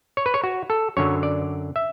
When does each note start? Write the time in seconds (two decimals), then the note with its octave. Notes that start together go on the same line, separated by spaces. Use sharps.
0.17 C#5
0.26 B4
0.34 C#5
0.44 F#4
0.70 A4
0.97 F#2 D3 F#3 C#5
1.23 D5
1.76 E5